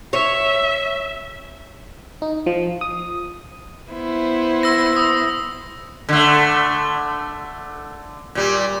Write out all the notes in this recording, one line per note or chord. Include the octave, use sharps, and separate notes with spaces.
C#5 E5
D#4
F3
D#6
B3 E4 C5
E6 A#6
D#6
D3 A3
A#2 G3